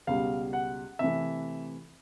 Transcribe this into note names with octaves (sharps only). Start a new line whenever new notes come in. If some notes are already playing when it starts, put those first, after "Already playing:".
C#2 B2 G3 F5
F#5
C3 E3 A3 E5